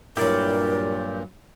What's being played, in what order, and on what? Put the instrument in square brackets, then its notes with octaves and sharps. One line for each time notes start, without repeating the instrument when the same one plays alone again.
[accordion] G2 A#2 [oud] F#3 E4 [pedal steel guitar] G4 D5 [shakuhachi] A#4